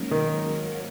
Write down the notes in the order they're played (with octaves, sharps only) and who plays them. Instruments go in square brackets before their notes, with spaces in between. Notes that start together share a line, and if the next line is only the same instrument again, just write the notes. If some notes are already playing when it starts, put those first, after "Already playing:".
Already playing: [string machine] G#2 F#3 A#3 C#4 A#4
[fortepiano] D#3